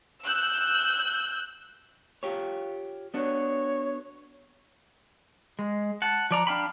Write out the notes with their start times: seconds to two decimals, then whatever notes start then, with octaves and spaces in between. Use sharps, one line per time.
0.24 E6 F#6 G6
2.23 F4 G4 C#5
3.14 B3 D4 F#4 C#5
5.59 G#3
6.02 F#5 A5
6.31 F3 D5 A#5
6.47 D4 F5 G5 B5